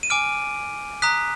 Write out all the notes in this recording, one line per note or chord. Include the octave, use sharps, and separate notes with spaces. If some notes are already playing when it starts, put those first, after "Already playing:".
D#7
G#5 D6 F6 D7
A#5 D#6 F#6 B6